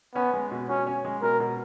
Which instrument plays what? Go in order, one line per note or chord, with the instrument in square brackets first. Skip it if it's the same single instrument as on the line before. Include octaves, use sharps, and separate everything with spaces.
[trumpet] B3 [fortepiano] C#4
[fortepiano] G#3
B2
[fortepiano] B2 [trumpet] C#4
[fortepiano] C#4
G#3
[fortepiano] B2 [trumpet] A#4
[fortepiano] B2